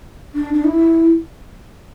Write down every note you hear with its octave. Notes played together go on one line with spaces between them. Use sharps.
D4
D4
E4